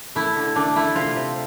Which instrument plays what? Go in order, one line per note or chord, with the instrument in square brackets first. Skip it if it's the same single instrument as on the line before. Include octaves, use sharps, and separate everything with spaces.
[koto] A3 E4
D3
A3 D4
A3 E4
C3 F4
C3